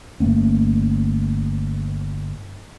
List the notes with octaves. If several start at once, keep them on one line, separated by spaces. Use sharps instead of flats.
G1 A3 A#3 C#4